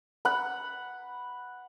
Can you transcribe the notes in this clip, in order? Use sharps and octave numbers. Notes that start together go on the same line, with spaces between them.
F#5 B5